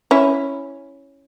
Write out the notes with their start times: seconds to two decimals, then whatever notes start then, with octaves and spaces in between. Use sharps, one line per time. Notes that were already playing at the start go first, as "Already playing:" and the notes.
0.11 C#4 E4